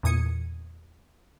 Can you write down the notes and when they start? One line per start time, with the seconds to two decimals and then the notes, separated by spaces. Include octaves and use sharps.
0.03 E2 A#2 D#6 G#6 C#7